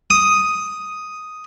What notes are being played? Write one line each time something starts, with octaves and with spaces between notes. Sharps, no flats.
D#6